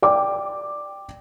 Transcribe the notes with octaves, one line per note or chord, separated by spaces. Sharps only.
D5 G5 D6